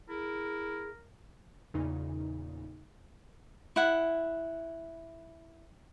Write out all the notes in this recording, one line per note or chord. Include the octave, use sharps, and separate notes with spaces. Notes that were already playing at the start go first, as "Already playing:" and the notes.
E4 G#4 A#4
E2 A#2 C#3 D#4
E4 F#5